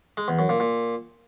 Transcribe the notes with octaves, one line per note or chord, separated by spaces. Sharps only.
G#3
E2
F#2
A#2
A#2